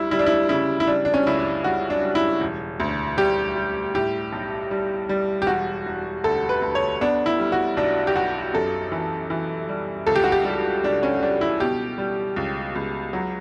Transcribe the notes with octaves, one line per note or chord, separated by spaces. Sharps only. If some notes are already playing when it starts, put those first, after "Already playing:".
Already playing: D2 G3 E4
G3 E4
D4
E4
C#3 E4
E4
G3 D4
D4
C#4
C#2 E4
D4
G3 F#4
D4
G3
E4
E1
D2
G3 G4
G3
A2 G4
B1
G3
G3
G4
E1 F#4
E1
D2 A4
B4
D2
C#5
B3 D4
E4
G3
F#4
B1 D4
G4
B1 F#4
F#2 A4
E3
E3
G3
C#2 A4
G4
F#4
G4
G3
C#2 D4
C#4
G3 D4
E4
B2 G4
G3
C#2
C#2
F#3